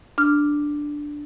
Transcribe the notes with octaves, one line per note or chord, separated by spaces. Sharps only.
D4 F6